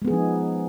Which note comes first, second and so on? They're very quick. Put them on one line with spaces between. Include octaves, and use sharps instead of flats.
G#3 B3 G#4 F3 D#4